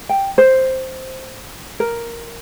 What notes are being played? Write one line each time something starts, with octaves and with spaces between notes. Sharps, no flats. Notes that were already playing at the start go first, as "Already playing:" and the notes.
G5
C5
A#4